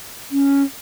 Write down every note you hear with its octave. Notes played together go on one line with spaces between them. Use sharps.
C#4